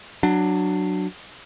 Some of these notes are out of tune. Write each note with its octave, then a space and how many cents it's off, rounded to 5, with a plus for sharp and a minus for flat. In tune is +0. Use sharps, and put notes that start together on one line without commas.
F#3 +0 D4 +15